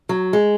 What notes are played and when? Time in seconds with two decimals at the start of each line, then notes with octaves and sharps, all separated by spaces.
0.09 F#3
0.33 G#3